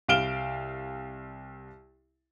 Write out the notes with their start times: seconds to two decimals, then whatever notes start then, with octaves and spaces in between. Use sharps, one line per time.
0.08 C2 F5 F6 D7 E7 G7